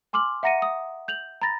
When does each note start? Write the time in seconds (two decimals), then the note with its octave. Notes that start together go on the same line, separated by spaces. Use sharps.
0.13 G#5 C6 D6 F6 F#7
0.43 E5 F#5 A#5 A#6 C#7 D#7
0.62 D#6
1.08 G6 F7 F#7
1.42 A#5 B5 A6 A#6